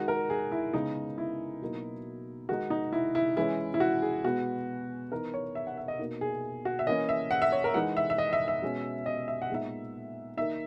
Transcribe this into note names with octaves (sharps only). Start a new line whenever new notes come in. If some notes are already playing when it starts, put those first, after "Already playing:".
Already playing: D#3 G#3 D#4 F#4
A#4
G#4
E4
C#3 G#3 B3 D#4
E4
B2 F#3 A#3 D#4
D#3 G#3 D#4 F#4
D#4
E4
E4
E3 G#3 C#4 E4
E4
F#4
G#4
B2 G#3 B3 F#4
E3 B3 D#4 A#4
C#5
E5
F#5
E5
D#5
B2 A#3 D#4
G#4
F#4
E5
E3 A#3 C#4 D#5
E5
F#5
E5
C#5
A#4
E3 G#3 D#4 F#5
E5
E5
D#5
E5
E5
B2 G#3 C#4
D#5
E5
F#5
A#2 G#3 B3 D#4 E5
D#3 A#3 D#4 E5